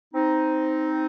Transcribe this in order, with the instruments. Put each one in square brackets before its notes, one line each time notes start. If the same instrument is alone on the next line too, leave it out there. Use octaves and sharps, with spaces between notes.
[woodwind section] C4 D#4